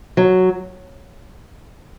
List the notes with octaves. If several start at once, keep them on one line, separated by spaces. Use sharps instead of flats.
F#3